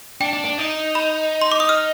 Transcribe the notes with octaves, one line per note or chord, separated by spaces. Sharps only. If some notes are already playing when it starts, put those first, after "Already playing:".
D4 G5
D4
D4
D#4
B5
C6
D6
D#6
F6